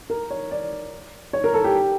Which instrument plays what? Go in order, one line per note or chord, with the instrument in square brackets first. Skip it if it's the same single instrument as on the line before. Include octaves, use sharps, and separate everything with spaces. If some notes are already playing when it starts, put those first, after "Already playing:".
[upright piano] A#4
C#5
D5
C#5
A#4
A4
G4